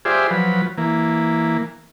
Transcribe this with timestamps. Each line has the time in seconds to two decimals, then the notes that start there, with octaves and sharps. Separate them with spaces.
0.05 F4 G4 G#4 C5 D5 E5
0.31 F3 F#3 B4
0.78 E3 A#3